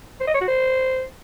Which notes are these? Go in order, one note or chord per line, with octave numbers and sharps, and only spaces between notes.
C5
D#5
C#5
F#4
C5